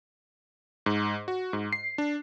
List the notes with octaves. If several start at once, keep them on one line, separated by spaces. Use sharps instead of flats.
G#2
F#4
G#2
C7
D4